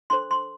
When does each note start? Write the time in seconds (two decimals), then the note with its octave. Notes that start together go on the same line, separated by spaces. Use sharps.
0.10 D4 A4 C5 C6
0.31 C6